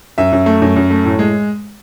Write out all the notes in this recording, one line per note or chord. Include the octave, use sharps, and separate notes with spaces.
F#2 E5
F#2
A3
F#2
F#2
A3
A2
G#3